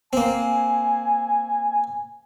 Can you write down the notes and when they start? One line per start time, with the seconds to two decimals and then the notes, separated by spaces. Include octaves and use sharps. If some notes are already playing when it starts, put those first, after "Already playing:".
0.13 A#3 C4 G#5